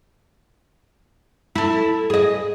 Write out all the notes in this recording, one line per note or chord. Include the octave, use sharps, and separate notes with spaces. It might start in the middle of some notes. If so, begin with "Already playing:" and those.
E4 A4
G#4 D#5